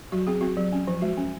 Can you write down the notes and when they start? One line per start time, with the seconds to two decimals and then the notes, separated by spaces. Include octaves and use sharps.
0.12 F#3 F#4
0.27 C4 G#4
0.41 C4 F#4
0.57 F#3
0.72 C#4
0.87 F3
1.02 G#3 F#4
1.17 C#4